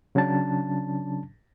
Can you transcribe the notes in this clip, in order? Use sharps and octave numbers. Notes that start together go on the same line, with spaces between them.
C#3 F#3 C#4 D4 A5